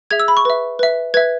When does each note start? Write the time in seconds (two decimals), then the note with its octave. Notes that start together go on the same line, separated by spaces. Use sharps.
0.11 G#4 E5 G#6
0.20 E6
0.28 B5
0.37 C#6
0.45 B4 E5
0.79 B4 E5
1.14 B4 E5 G#6